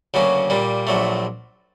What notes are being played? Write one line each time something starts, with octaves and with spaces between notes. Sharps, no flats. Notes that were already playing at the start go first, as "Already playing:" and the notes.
D2 C#3 F#3 A#3 C#4
A#2 G3 A#3
A#1 A#2 F#3 A3